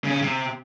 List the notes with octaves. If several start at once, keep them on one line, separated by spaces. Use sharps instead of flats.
C#3
C#4
C#3
C3